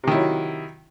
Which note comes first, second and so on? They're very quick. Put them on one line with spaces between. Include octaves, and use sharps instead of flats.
C3 D#3 E4 F#3